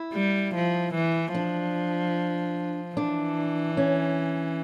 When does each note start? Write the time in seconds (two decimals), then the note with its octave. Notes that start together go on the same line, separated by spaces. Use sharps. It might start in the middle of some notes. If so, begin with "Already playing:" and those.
Already playing: E4
0.13 G3
0.55 F3
0.95 E3
1.34 F3 D4
2.96 E3 D4
3.77 C#4